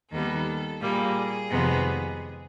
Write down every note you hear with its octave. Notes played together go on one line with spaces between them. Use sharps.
D#2 D#3 G3 B3 A4
A#2 G3 A#3 G#4
F2 C3 D#3 G#3 B3